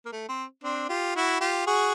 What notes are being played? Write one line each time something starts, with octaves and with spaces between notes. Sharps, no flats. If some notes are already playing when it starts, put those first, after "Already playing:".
A#3
A3
C4
C4 D4
F4 G4
E4 F#4
F4 G4
F#4 G#4